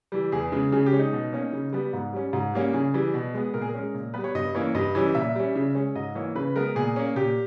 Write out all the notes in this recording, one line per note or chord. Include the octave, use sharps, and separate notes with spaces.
E3 G3
E2 G#4
C#3 G#3
C#3 G#4
G4
G#3 C#4
D#4
B2
A#3 C#4
C#3
G3 B3
G#2
G3 C#4
G#2
G3 A#3 C#4
C#3 G#4
E3 G3
B2
G#3 B3
A#2 A#4
G#4
A#4
G#3 C#4
A#2
G3 B3 B4
C#5
G2 D#5
E3 A#3 C#4 C#5
G2 D#5
E3 G3 C#4
A#2 E5
G3 C#4
C#3
G#3 C#4
G#2 D#5
E3 A#3 C#5
C#3 B4
G#3 B3 A#4
A#2 G#4
A#3 C#4
A#2 G4